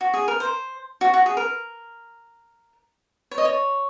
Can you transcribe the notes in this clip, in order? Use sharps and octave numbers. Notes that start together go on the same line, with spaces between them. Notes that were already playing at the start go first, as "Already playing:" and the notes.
F#4
G#4
A#4
C5
F#4
F#4
G#4
A#4
C#5
D#5
C#5